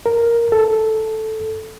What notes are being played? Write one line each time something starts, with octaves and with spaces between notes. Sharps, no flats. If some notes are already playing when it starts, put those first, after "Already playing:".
A#4
A4